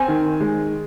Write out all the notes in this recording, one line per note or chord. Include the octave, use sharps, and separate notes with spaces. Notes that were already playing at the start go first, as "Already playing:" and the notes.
Already playing: C4 G#5
D#3
G#3